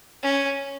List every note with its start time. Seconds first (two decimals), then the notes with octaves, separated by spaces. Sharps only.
0.23 C#4